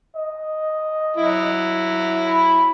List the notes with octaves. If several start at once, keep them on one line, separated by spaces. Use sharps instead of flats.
D#5
F#3 E4
B5